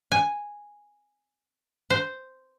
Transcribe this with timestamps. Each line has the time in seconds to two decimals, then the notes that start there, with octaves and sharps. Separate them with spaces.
0.12 G#5
1.90 C5